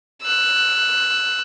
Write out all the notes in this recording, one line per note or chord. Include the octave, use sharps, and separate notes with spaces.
E6 F#6